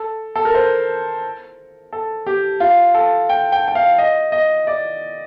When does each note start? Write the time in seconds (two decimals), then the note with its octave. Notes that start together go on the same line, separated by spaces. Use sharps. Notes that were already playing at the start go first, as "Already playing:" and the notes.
Already playing: A4
0.36 A4
0.45 A#4
0.55 C5
1.93 A4
2.26 G4
2.60 F4
2.94 A4
3.29 G5
3.52 G5
3.68 G5
3.75 F5
3.98 D#5
4.32 D#5
4.67 D5